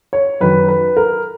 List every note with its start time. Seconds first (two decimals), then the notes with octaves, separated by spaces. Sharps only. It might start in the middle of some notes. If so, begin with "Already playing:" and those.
0.13 C#5
0.41 F#2 D#3 B4
0.68 B4
0.97 A#4